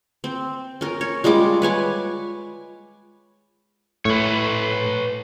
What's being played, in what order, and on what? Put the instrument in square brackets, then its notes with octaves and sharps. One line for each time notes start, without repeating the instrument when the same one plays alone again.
[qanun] C4
C#4 A#4
C#5
G3 G#3 F4 D6
B4 C#5 G#5 D6
[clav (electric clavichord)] A2 [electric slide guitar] B4 C#5